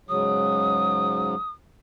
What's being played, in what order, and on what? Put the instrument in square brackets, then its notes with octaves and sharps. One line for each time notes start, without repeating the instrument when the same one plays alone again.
[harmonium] G#2 C#3 F#3 [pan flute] D#6